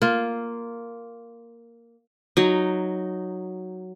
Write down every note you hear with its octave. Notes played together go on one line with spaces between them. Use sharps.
A#3 F4
F#3 D#4